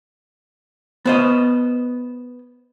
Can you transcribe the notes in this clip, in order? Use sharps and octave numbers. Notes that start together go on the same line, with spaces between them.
B3 C5 D#5